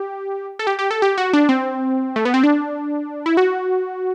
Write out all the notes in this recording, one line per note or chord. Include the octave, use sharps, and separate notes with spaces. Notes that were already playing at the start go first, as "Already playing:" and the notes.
Already playing: G4
A4
G4
G4
A4
G4
F#4
D4
C4
A3
B3
C4
D4
E4
F#4